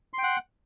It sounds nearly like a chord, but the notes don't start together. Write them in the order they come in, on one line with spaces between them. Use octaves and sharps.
C6 G5 F#5